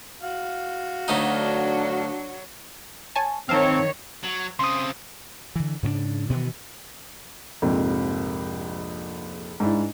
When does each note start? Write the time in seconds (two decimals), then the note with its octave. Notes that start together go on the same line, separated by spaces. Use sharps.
0.22 F#4 F5
1.08 D2 F#3 A3 D4 D#4
3.16 C#5 G#5 A5
3.49 D#3 C4 C#5 F5 A5 A#5
4.23 F#3
4.59 C#3 C4 C6 D#6
5.56 D3 E3
5.83 G#2 C#3 C4 D4
6.30 B2 D#3 E3 B3
7.62 A#1 F2 G#2 C3
9.60 G#2 D4 E4